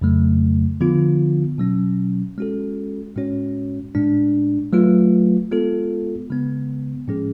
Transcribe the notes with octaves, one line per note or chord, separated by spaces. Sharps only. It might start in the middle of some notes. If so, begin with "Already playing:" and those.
F2 C#3 F#3 A3
D3 F3 B3 F4
B2 F#3 C#4
G#3 C#4 F#4 A4
A2 G#3 C#4 F#4 C#5
A2 G#3 D4
F#3 A3 F4 B4
G#3 B3 F4 A4
C#3 G#3 B3
A2 F3 G#3 C#4 G#4